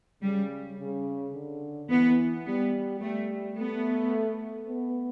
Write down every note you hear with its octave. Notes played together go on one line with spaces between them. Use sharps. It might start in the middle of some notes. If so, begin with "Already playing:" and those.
C#3 G3
C#3
D3
E3 B3
G3 B3
G3 A3
A3 B3
B3